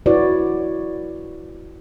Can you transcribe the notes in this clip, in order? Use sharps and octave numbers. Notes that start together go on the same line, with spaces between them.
E4 F#4 B4 C#5 D5